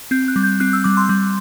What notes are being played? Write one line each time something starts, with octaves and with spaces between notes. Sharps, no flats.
C4 G6
F#6
G3
G6
C4 F#6
E6
G3 D6
C6
G3